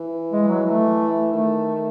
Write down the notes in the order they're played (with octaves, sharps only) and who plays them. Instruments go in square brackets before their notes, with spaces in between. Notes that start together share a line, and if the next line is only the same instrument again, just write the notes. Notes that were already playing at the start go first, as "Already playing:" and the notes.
Already playing: [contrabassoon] E3
[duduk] G#3
F#3
[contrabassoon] E3 [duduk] A3
[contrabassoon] D#3 [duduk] A3